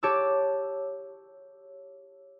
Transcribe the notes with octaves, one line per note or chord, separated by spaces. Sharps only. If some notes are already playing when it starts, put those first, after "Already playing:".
G4 C#5 A5 D6 E6